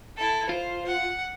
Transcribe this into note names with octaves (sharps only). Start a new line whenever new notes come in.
E4 A4
F4 C5
F#5